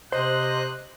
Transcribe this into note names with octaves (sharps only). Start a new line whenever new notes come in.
C3 C5 D#5 F#6